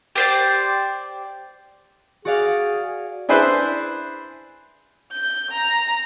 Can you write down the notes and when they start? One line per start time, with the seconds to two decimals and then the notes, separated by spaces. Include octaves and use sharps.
0.16 G4 C5 D5
2.25 F#4 G#4 D5 F5
3.29 D4 E4 G#4 B4 C5
5.12 G6
5.51 A#5